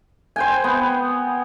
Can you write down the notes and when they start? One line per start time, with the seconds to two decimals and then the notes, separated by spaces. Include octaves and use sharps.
0.36 C5 G5 G#5
0.64 B3